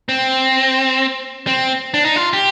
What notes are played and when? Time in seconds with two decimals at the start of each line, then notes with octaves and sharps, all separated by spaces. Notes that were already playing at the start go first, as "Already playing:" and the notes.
0.09 C4
1.47 C4
1.94 D4
2.05 D#4
2.16 F4
2.33 G4